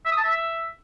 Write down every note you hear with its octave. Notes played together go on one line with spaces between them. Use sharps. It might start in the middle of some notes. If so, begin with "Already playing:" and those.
E5
D#6
A5
E5